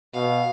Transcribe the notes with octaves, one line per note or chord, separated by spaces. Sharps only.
B2 F5